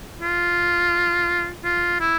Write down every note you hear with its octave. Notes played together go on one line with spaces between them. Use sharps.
F4
F4
E4